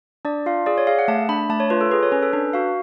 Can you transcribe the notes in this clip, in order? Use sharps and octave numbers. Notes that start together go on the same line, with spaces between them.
D4 D5
F4 F5
G#4 D5
C#5
G#4 F5
F#5
A3 A5
D4 B5
A3 A5
C#5
F4 B4
A4
G#4 B4
C#5
C#4 B4
A4
D4 B4
F#4 F5